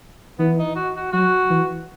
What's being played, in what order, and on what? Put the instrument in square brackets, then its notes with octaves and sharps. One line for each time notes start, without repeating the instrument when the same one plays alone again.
[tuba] E3 [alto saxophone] B3
[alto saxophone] D#4
F#4
F#4
[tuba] F#3 [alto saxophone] F#4
[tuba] E3